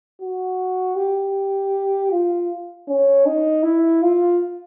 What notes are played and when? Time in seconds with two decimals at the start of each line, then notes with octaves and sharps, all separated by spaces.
0.21 F#4
0.96 G4
2.12 F4
2.88 C#4
3.26 D#4
3.63 E4
4.02 F4